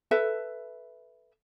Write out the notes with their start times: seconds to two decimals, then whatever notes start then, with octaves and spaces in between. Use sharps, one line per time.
0.11 A4 B4 E5